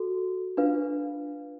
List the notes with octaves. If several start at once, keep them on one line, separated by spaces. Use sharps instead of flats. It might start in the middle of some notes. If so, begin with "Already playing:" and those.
Already playing: F#4 A4
D4 F4 B4 F5